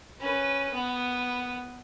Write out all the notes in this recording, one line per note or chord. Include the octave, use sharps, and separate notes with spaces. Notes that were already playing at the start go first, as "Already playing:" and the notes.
C#4 B4
B3